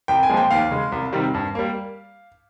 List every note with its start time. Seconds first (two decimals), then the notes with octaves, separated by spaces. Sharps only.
0.08 C2 G5
0.23 G#5
0.30 A#2 F3 G#3
0.37 G5
0.50 D#2 F5
0.71 C#3 G#3
0.92 C2
1.13 C3 D#3 G3
1.34 G2
1.55 G3 A#3